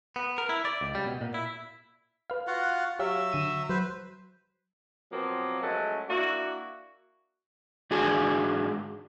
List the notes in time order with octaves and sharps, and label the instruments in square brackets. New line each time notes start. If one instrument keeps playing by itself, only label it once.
[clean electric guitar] B3
A#4
E4
D5
C#2
G3
B2
A#2
E4
[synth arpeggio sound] B4 F5
[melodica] F4 F#4 F#5
[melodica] F#3 E5 [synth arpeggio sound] G4 C#5 F5
[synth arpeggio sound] D3 D#7 E7
[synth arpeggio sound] F#3 [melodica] B4 C5
[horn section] B2 F3 F#3 A#3 C4
F3 F#3 G#3 A3 C#4
A#3 D4 E4 F#4
[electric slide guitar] G#2 D4 F#4 G#4 G#5